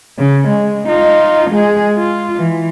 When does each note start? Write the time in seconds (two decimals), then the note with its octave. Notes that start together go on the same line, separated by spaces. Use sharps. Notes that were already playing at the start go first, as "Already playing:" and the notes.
0.19 C#3
0.48 G#3
0.87 D#4 F4
1.51 G#3 G#4
1.96 F4
2.36 E3